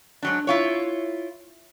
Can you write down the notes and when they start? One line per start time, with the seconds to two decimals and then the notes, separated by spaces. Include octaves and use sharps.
0.23 G#2 F#3 D4
0.47 E4 F4 C#5